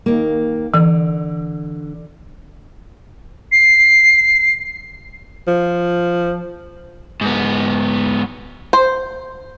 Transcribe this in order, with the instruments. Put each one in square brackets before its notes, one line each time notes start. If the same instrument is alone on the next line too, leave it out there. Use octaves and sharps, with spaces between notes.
[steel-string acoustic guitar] D#2 A#3
[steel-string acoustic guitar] D3 [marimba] E3
[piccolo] C7
[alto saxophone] F3
[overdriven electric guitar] G#2 B3
[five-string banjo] C5